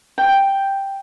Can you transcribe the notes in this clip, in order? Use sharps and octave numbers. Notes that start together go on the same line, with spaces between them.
G5